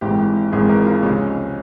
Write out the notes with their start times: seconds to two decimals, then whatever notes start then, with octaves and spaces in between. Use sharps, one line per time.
0.01 G#1 G#2 E3 G#3 G4
0.51 G#1 G#2 E3 G#3 G#4
0.69 A#4
0.85 F4
1.03 C#2 C3 F3 G#3 C#4